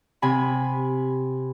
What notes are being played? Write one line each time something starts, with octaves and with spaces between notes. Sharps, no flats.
C3 G#5 B5